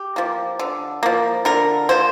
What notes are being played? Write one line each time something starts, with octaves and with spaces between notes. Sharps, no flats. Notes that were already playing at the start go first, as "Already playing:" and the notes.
Already playing: G4
F3 A#3
D3
F3 A#3
D3 A#4
F3 A#3 C5